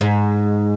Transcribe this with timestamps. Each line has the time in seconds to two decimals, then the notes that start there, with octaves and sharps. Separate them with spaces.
0.01 G#2